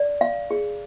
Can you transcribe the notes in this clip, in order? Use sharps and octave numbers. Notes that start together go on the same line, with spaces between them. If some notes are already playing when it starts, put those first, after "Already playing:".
Already playing: D5
F5
G#4